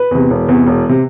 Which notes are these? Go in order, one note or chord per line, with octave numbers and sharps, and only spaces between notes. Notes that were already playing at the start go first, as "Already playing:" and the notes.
Already playing: B4
E2 C3
E1
E2 C3
E1
C3